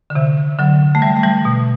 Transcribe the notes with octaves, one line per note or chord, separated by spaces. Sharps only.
D3
C3 E3
D3 F#3
A3
E3 G3
A3
E3 G3
B2